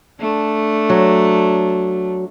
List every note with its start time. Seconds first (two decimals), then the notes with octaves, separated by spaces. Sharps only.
0.20 A3 D4
0.89 F#3